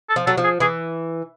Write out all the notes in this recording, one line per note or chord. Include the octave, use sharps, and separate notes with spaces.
A4
F3
F#3 A4
F3
G#4
E3 G#4